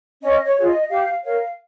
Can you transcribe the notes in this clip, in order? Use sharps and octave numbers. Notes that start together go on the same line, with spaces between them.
C#4 D#5
C#5
F4 G#4 C#5
D#5
G4 F5
A#4 C#5 F5